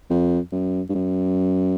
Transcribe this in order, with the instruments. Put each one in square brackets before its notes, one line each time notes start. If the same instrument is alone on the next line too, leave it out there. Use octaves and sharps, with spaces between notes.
[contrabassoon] F2
F#2
G2
F#2